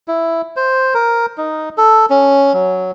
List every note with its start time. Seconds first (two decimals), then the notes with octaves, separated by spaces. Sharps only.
0.08 E4
0.56 C5
0.94 A#4
1.38 D#4
1.78 A4
2.10 C#4
2.53 F#3